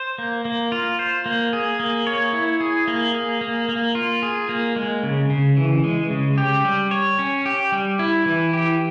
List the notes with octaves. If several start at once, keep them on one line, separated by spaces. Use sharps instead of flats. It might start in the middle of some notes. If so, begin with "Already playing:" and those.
Already playing: C5
A#3
A#3
F4
C5
A#3
G#4
A#3
C#5
E4
G#4
A#3
G#4
A#3
A#3
F4
G#4
A#3
G#3
C#3
C#3
E3
G#3
C#3
G4
G3
C#5
C#4
G4
G3
E4
E3
G4